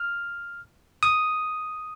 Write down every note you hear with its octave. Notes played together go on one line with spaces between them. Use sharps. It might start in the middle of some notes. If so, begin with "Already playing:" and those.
Already playing: F6
D#6